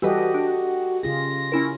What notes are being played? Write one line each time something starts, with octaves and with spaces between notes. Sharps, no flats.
E3 G3 F#4 G4 A4 B4 D#5
D4
C#3 F4 G#4 A#6
C#4 E4 A#4